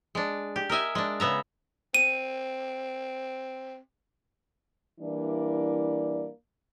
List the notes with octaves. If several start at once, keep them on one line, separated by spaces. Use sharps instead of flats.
G#3 D4
G4
A#4 D#5 E5 G#5
G#3 D4
C#3 B3 E5 A#5
C4 D#7
E3 G3 A#3 D4 E4 D5